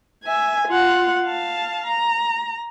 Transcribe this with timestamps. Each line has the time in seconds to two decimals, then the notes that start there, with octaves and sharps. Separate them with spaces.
0.24 E5 G#5
0.68 F4 F#5
1.25 F5 A5
1.86 A#5